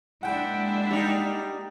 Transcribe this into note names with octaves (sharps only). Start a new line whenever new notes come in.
G#3 A#3 D4 E4 F#5 G5
G3 D#4